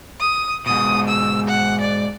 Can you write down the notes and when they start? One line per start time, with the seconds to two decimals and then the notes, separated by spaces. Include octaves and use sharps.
0.20 D#6
0.66 G#2 B2 D#6
1.08 E6
1.48 F#5
1.81 D5